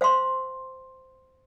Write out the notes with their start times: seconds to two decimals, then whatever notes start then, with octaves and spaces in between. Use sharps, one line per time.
0.01 C5 F5 C6